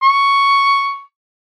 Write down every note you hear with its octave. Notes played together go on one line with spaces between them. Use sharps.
C#6